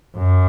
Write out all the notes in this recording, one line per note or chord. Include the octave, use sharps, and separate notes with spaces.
F#2